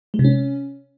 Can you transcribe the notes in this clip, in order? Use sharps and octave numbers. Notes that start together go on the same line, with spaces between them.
G#3
C3
C#4